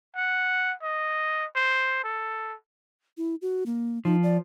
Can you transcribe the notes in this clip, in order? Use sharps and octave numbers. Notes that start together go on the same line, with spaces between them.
F#5
D#5
C5
A4
E4
F#4
A#3
F3 D#4
D5